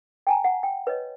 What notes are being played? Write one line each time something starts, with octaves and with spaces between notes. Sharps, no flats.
G5 G#5 A#5
F#5
G5
B4 C#5 D#5